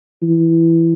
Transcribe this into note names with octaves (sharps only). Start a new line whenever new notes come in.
E3